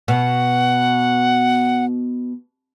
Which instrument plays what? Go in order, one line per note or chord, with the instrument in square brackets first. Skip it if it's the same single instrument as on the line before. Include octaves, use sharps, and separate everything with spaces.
[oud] B2 [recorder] F#5